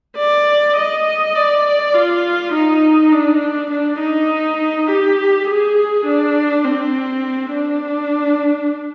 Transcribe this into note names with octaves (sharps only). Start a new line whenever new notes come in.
D5
D#5
D5
F4
D#4
D4
D4
D#4
G4
G#4
D4
C4
D4